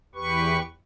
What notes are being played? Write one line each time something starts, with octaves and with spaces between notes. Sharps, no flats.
E2 G4 B4 C#6